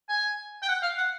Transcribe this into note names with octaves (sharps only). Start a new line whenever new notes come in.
G#5
G5
F#5
F5
F#5